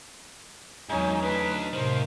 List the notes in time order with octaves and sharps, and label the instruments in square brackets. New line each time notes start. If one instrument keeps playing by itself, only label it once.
[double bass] E2 F#3 [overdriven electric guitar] G#2 D#3 [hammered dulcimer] C#4 D#4 [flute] G#5
[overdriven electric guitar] D2 D4 [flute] B4
[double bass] A2 C3 [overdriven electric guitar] D#3 A#3 [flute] C5